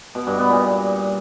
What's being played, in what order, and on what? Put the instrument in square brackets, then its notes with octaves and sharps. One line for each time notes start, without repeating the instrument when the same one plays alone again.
[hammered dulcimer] B2
G2
B3
A#2